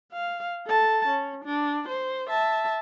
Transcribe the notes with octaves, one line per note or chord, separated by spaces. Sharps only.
F5
A4 A5
C#4
D4
C5
E5 A5